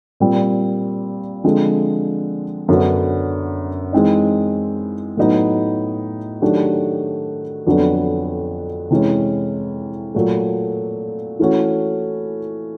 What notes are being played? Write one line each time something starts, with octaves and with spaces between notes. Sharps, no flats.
A#2 G3 C4
D3 F3 G#3 C4
F#2 D3 F#3 B3 D4
E3 G#3 C4 D#4
A2 F#3 B3 D#4
D#3 F#3 A3 D4 G4
F2 D3 F#3 B3 D4
C3 E3 G#3 C#4
A#2 F#3 A3
E3 A3 C#4 F#4